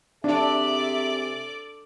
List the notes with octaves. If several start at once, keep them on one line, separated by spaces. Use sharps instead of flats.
C3 D4 G#4 A4 D5 E5